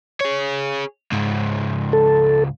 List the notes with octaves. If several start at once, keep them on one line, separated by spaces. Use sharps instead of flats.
G#4 C#5
C#2 G#2
A4